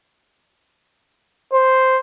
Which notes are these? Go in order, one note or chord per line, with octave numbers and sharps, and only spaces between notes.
C5